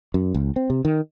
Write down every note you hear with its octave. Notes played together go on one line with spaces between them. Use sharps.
F#2
C#2
C4
C3
D#3